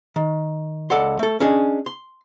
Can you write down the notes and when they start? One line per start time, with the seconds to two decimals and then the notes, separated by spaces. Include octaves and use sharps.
0.16 D#3
0.90 C#2 A4 D5 F#5 C6
1.19 A3 A4
1.40 C#4 D4 G#4 D#5
1.86 C6